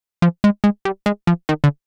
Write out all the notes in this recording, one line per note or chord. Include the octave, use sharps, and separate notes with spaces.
F3
G#3
G#3
G3
G#3
F3
D#3
D3